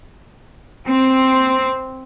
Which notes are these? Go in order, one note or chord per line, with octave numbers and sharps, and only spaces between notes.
C4